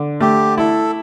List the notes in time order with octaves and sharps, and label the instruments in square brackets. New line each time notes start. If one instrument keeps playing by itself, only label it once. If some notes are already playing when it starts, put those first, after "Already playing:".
Already playing: [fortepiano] D3
[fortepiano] A3 [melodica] G4
[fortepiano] E4 [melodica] A4